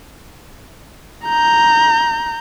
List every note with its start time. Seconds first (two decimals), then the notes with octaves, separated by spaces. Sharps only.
1.25 A#5 G6